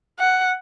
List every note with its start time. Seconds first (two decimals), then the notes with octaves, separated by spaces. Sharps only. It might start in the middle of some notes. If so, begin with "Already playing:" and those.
0.19 F#5